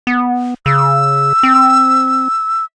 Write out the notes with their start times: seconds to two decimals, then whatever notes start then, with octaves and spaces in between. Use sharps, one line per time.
0.07 B3
0.66 C#3 E6
1.43 C4